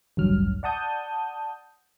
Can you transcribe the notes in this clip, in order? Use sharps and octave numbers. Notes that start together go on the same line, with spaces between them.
A1 D2 G2 F#3 F6
D5 F#5 A5 D#6 G6